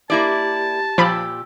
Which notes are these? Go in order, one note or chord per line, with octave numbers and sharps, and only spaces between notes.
A#3 E4 G4 D5 A5
A#2 F3 G4 B5 E6